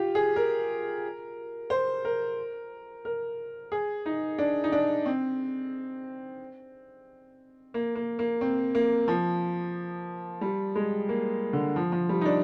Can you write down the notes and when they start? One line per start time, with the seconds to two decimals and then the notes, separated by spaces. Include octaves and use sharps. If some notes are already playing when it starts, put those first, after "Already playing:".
Already playing: F4 G4
0.15 G#4
0.36 A#4
1.70 C5
2.05 A#4
3.05 A#4
3.72 G#4
4.06 D#4
4.38 D4
4.64 D#4
4.72 D4
5.06 C4
7.74 A#3
7.95 A#3
8.19 A#3
8.41 C4
8.75 A#3
9.08 F3
10.41 G3
10.75 G#3
11.09 A#3
11.53 D3
11.76 F3
11.92 F3
12.09 G3
12.21 D#4
12.25 D4